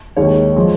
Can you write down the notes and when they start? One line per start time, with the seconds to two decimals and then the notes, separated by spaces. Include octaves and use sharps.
0.17 D#2 D#3 G#3 C#5
0.56 F3 G#3